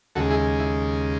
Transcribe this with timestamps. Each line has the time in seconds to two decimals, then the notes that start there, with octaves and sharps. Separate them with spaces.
0.15 D#2 C#3 G#3 F#4 A4
0.30 E4 G#4
0.59 E4